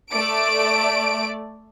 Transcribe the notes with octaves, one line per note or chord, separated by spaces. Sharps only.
A3 D5 D7